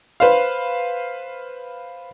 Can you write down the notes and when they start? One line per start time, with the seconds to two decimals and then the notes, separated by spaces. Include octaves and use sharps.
0.20 B4 C5 F5